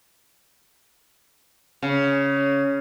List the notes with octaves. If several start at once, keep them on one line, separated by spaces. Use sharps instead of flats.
C#3